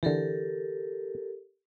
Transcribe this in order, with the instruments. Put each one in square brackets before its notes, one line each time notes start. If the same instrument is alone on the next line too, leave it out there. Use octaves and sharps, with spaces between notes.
[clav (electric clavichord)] D3 E3 [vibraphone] G4 A4 A#4